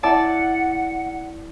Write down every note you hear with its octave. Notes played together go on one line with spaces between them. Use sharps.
E4 D5 F#5 A5